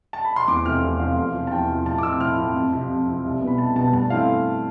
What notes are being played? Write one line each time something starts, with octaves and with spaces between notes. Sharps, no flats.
A5
B5
C6
E2 D6
C3 F3 A3 C4 F6
E2
C3 F3 A3 C4 F5
E2 F5
C3 F3
A5
E2 G5
C3 F3
A2 A5
D6
F3 C4 E6
A2 F6
F3 C4
F2
C3 F3
F2
C3 F3
C2
B2 B3
B5
C2 A5
B2 B3 A5
G2 A5
E3 A3 C4 F5